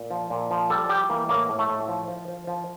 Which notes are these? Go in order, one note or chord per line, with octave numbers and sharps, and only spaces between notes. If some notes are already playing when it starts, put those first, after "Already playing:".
Already playing: A#2
F3
A#2
F3
G3 A4
G3 G4
E3 A#3
A2 A#3
A2
A3
A2
F3
F3
F3
F3